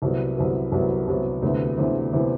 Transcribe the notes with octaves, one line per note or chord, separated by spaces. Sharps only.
C2 C3 F#3 B3
C2 C3 F#3 B3
C2 C3 F#3 B3
C2 C3 F#3 B3
D2 C3 E3 B3
D2 C3 E3 B3
C3 E3 B3